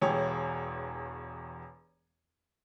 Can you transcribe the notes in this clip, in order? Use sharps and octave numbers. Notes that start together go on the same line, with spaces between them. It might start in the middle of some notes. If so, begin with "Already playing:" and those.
E1 E2 G4 C#5